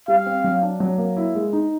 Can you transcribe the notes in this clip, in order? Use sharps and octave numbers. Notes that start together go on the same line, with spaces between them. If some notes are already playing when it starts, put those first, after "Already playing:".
G3 F5
C4
F#3
D4
F#3
A#3
E4
G#3
D#4